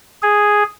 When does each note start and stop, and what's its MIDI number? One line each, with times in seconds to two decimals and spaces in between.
0.22 0.63 68